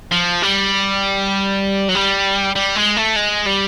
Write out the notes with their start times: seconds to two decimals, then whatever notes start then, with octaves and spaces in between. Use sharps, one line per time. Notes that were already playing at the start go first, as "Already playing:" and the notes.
0.12 F3
0.42 G3
1.89 F#3
1.95 G3
2.55 G3
2.76 G#3
2.97 A3
3.16 G#3
3.47 G3